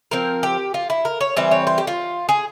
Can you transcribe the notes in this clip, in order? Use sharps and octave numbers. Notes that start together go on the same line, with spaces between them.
F3 C4 A#4
G4
F4
E4
A#4
C#5
E3 G3 C4 E5
C#5
C5
G4
F4
G#4